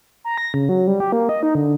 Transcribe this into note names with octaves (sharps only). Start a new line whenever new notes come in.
A#5
A#6
C#3
F#3
G3
G4
A#3
D#5
D#4
D3